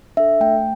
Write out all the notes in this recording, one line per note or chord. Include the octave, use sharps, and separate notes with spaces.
D4 A4 E5
A3 G5